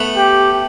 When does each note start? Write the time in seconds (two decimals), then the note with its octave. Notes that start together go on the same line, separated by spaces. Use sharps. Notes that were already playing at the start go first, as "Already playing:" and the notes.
Already playing: A3 B3
0.17 G4